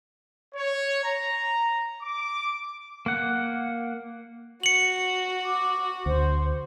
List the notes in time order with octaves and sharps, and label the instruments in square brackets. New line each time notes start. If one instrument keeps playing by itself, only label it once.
[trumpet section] C#5
A#5
D6
[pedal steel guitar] A#3 F#5
[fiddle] F#4 [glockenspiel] C#7 F#7
[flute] D6
[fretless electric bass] D2 [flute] C5